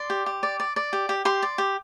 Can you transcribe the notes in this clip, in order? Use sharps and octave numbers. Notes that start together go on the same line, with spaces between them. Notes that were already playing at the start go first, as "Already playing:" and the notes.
Already playing: D5 C6
G4
G4
D5
D5
D5
G4
G4
G4 C6
D5
G4